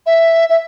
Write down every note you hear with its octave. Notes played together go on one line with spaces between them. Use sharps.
E5
E5